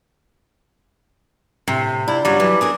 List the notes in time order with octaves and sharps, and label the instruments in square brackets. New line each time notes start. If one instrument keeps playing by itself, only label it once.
[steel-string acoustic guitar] A2 [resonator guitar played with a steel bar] C3
[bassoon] D4 [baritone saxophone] E4 [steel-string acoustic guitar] F4
[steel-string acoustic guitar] G2 C#3 F4 [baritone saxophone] F#3 [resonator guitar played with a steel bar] G3
[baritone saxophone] E3 [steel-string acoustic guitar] F#3
[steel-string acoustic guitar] C4 D4 A#4 [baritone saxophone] G#4